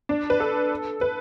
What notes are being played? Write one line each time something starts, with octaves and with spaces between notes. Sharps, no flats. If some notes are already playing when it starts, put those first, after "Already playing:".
D4
B4
A4
B4